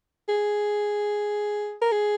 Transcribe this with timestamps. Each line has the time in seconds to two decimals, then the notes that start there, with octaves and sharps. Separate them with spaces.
0.29 G#4
1.82 A#4
1.92 G#4